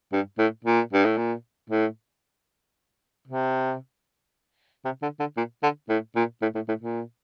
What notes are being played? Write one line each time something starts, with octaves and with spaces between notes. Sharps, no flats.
G2
A2
A#2
G2
A2
A#2
A2
C3
C3
D3
D3
A#2
D3
A2
A#2
A2
A2
A2
A#2